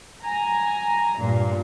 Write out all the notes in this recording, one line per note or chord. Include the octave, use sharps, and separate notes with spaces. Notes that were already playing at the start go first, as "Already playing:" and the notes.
G#5 A#5
G2 A#2